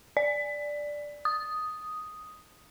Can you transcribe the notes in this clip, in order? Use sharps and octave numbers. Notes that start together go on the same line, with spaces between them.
D5
D#6